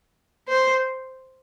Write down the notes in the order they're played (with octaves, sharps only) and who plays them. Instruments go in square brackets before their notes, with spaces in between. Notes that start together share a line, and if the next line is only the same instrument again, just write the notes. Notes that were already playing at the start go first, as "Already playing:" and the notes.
[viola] C5